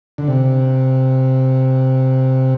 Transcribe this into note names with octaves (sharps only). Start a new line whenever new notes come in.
D3
C3